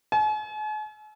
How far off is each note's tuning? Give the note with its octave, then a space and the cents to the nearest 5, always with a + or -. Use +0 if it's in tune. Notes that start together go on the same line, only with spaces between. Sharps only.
G#5 +45